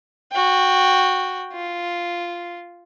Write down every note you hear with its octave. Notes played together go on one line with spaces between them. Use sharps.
F#4 G5
F4